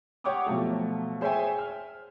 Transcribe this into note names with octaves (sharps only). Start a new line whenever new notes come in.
G4 C#5 F#5 G5 D6 D#6
B2 F3 F#3 A3
G#4 C5 C#5 E5 G5 G#5
F6